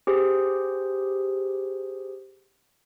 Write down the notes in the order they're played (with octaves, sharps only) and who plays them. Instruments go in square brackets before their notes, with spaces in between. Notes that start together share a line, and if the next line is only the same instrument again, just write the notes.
[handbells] G4 G#4 C5